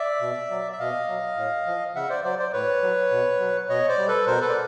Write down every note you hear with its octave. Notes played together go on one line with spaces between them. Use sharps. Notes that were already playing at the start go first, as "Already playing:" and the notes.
Already playing: D5 E5
B2
F#3
E5
B2 D#5 F5
F#3
A2
F3
C#3 E5 F#5
C5 D5
F#3 C5 D5
C5 D5
A2 B4 C#5
F#3
B2
F#3
B2 C#5 D#5
C5 D5
G3
A4 B4
B2 A#4 C5
A4 B4
D5